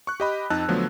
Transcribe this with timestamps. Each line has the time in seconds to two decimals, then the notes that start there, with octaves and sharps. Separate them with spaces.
0.07 C#6 F#6
0.20 G4 D#5 B5
0.50 F2 D#4 A5 E6 F#6
0.68 D3 F3 F#3 A3 B3